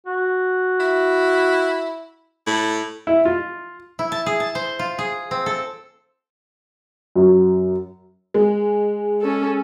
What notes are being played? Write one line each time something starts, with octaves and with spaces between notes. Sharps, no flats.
F#4
E4
A2
E4
F4
E4
A5
G#4
A5
C5
F4
G#4
C4
A4
F#2
G#3
C#4 A4